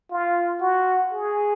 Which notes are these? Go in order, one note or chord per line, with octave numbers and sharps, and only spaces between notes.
F4
F#4
G#4